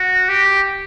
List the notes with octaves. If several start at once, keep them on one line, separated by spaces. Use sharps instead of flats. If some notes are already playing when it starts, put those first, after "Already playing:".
Already playing: F#4
G4